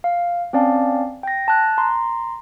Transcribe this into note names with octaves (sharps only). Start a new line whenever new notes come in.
F5
C4 C#4 D5 F5 A5
G5 A#6
A5 F#6
A#5 C6